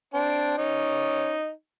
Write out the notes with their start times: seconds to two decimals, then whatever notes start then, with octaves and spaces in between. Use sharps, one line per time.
0.14 C4 D4
0.57 C#4 D#4